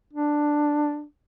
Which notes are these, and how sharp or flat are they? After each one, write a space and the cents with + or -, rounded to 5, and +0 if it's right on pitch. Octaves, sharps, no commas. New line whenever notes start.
D4 +10